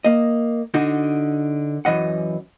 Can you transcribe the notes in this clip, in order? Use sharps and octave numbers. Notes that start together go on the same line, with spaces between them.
A#3 D#5
D3 D#4 F#4
F#2 E3 D#5 F#5